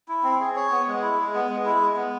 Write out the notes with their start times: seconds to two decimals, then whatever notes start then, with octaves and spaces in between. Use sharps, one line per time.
0.08 E4
0.23 C4
0.40 G#4
0.56 C#5
0.71 B3
0.87 G#3
1.02 E4
1.18 G#3
1.34 B3
1.50 G#3
1.65 E4
1.81 G#3
1.96 B3